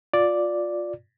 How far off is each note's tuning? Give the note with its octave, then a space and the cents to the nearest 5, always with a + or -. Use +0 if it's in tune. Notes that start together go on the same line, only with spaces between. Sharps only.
F4 +20 D5 +0